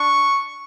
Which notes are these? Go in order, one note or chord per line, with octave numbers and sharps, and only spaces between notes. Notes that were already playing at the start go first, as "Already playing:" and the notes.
Already playing: D4 C#6